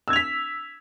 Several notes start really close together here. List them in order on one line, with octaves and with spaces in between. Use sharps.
E6 G#6 F7 B6